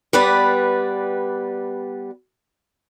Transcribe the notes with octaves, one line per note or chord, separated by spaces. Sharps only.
G3 B3 B4 D5